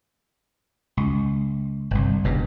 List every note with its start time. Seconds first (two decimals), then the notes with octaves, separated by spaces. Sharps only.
0.97 C#2
1.91 G1 C2
2.24 F#1 E2 G2 B2